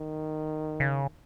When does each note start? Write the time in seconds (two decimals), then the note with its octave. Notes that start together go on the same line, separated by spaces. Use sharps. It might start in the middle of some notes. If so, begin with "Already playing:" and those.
Already playing: D#3
0.80 C#3